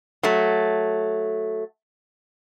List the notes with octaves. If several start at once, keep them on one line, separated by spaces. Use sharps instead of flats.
F#3 A3